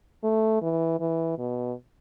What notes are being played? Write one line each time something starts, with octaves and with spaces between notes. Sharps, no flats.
A3
E3
E3
B2